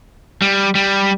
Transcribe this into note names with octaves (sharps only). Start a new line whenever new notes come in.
G3
G3